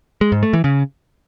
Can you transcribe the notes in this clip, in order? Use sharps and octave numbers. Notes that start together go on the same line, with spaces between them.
G#3
G#2
A3
E3
C#3